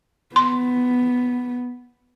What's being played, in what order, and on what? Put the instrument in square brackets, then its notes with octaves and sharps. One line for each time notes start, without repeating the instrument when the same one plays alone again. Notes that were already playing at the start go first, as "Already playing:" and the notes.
[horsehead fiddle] B3 [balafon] C6